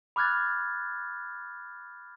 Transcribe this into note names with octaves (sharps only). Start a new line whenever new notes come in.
B5 D6 F6 F#6 G#6 A6